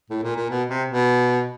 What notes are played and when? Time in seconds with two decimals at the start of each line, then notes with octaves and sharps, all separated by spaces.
0.10 A2
0.23 A#2
0.36 A#2
0.50 B2
0.69 C3
0.88 B2